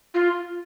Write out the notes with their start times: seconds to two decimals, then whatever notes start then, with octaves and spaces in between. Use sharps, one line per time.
0.14 F4